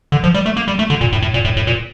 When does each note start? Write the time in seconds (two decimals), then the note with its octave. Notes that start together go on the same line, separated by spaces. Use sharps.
0.12 D3
0.24 F3
0.34 G3
0.46 A3
0.57 A#3
0.68 G3
0.79 A3
0.90 D3
1.01 A#2
1.12 A2
1.22 A2
1.34 A#2
1.45 A2
1.57 A2
1.67 A#2